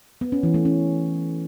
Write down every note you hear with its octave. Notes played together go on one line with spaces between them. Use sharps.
B3
C#4
E3
A3
C#4